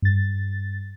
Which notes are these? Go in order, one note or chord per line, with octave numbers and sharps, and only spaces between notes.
G2 A6